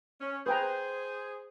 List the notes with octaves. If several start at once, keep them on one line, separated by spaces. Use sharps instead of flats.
C#4
G#4 B4 C5 G5 A#5